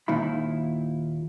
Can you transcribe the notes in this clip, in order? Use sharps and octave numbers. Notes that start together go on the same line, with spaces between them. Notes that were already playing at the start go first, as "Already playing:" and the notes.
D#2 A#2 D#3 E4 B5